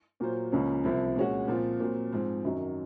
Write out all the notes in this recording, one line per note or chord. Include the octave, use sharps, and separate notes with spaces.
A#2 F#3 A#3 F4 C5
C#2 C#3 F3 A#3 C#4
C2 C3 F3 C4
A#2 G#3 C#4 F#4
A#2 F3 C4 F4
A#2 F#3 C4
G#2 F3 C4
F#2 D#3 F#3